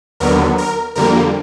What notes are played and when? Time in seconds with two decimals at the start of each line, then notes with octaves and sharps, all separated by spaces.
0.20 D#2 D3 F#3 B3 A#4
0.58 A#4
0.95 F2 D3 G3 A#3 A#4